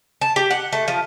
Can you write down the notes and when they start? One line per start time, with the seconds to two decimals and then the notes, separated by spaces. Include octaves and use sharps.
0.21 A5
0.36 G4
0.51 F#5
0.73 A3
0.88 F3